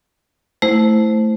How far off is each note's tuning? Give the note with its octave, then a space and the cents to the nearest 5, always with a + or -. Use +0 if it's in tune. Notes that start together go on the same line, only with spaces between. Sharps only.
A3 +0 E4 +0 C5 +0